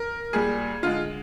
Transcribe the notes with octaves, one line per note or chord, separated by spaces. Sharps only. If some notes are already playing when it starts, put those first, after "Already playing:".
Already playing: A#4
A#2 G3 G#4
D3 G#3 F4